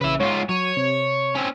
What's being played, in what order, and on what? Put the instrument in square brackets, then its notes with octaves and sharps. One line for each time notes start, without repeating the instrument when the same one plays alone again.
[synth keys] A#1 C#3 [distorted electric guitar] B4 E5
[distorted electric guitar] G#2 F4 [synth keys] C#5
[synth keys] F#3 D#7 [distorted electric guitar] C#5
[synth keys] C3
[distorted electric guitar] C4 C#4